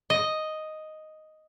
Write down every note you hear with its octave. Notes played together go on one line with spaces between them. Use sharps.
D#5